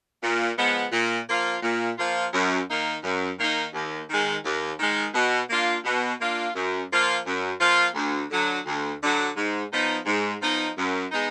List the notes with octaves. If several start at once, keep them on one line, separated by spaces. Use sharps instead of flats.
A#2
F3 G#3 B3
A#2
F3 A#3 F4
A#2
F3 A#3 F4
F#2
D#3 A#3 D#4
F#2
D#3 A#3 D#4
D#2
D#3 G#3
D#2
D#3 G#3
B2
A#3 D4 F4
B2
A#3 D4 F4
F#2
F3 A#3 F4
F#2
F3 A#3 F4
D2
D3 F#3
D2
D3 F#3
G#2
F3 B3 D#4
G#2
F3 B3 D#4
F#2
G#3 B3 D#4